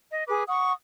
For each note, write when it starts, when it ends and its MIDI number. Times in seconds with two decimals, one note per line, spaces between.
0.10 0.23 75
0.28 0.43 68
0.28 0.43 71
0.28 0.43 86
0.47 0.72 78
0.47 0.72 85
0.47 0.72 87